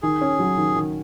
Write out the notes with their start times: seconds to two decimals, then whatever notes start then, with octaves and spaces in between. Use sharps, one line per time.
0.02 D#3 G#4
0.21 C#4
0.39 F#3
0.58 D#3
0.76 D#3